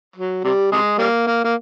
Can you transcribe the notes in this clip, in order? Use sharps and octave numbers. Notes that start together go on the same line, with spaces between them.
F#3
C3 G3
C3 G#3
G3 A#3
A#3
A#3